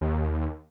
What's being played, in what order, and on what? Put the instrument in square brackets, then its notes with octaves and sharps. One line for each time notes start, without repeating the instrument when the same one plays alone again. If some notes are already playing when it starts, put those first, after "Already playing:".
[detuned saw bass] D#2